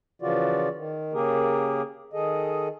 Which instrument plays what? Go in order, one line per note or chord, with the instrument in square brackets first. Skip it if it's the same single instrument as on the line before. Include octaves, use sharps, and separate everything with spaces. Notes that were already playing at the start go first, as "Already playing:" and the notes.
[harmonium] C#3 E3 F3 F4 F#4 D5
D#3
C#3 A#3 G4 G#4 A#4
D#3 G#4 A4 D#5